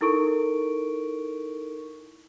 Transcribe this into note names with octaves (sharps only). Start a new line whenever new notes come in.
D#4 E4 A4 A#4 C#6 D7